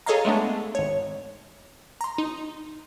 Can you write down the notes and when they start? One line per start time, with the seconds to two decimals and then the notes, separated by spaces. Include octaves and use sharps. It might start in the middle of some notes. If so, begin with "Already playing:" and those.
0.06 G#4 A4 C#5 D#5 F5 A#5
0.25 G#3 A3 B3 D4
0.75 G#1 C#5
2.01 A#5 C6
2.18 D#4